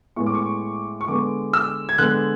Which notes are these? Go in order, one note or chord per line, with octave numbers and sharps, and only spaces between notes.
A2 G#3 B3 C#6
D6
C#6
C#6
D3 G#3 B3 D6
E6
G#6
D3 G#3 B3 F#6